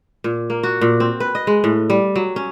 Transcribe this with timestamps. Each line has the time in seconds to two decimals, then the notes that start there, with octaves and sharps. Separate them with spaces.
0.24 A#2
0.50 A#3
0.63 F#4
0.81 A#2
1.00 C4
1.20 B4
1.35 D#5
1.47 G#3
1.64 A2
1.90 G3
2.16 F#3
2.36 C#4